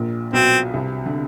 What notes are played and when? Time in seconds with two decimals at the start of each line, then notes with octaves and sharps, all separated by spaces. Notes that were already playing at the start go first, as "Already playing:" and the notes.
Already playing: A#1 A#2
0.33 B1 B2 C4
0.74 C2 C3
1.06 D3